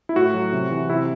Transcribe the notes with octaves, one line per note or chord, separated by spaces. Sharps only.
E4
A2 F#4
F#3
C3
E3
C3 E4